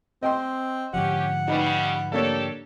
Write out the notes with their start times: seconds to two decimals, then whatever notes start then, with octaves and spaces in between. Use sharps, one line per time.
0.23 C4 D#5 G5 C6
0.94 G#2 D3 F3 C#4 G4 F#5
1.48 C#3 G3 D#4 B4
2.12 A#3 D4 G4 A4 C#5